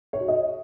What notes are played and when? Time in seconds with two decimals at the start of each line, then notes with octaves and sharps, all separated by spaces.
0.13 C#5
0.21 F#4
0.28 D#5